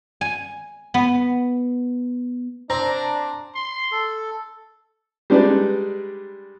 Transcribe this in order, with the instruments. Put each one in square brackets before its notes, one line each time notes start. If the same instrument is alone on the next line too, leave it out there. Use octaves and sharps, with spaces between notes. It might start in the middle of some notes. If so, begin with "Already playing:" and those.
[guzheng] G#5
B3
[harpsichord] C4 [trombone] D4 [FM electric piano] A#5
[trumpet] C6
[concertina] A4
[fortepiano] G3 G#3 D4 D#4 B4 D5